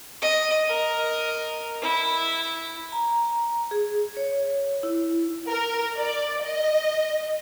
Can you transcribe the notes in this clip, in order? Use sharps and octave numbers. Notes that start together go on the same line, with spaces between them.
D#5
A#4 D#5
E4
A#5
G#4
C#5
E4
A#4
D5
D#5